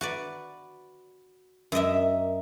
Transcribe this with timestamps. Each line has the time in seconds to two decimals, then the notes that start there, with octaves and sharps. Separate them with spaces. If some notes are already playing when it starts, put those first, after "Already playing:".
0.01 F#4 B4 D5
1.72 F#2 A#4 D#5 E5